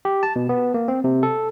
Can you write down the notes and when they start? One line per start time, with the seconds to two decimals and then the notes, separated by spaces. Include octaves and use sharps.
0.05 G4
0.23 A5
0.36 B2
0.49 B3
0.74 A#3
0.88 C4
1.04 C3
1.23 A4